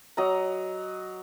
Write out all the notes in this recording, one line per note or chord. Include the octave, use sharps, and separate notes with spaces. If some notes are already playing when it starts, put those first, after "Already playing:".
F#3 D#5 A#5